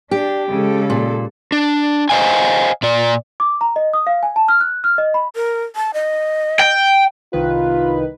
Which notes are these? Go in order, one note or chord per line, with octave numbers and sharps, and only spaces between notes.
D4 G4
C#3 G#3 A4
A#2
D4
C5 D#5 F5 G#5
A#2 D5
D6
A#5
D#5
D#6
F5
G#5
A5
F6
F#6
F6
D#5
B5
A#4
A5
D#5
G5
C2 D#3 F4 B4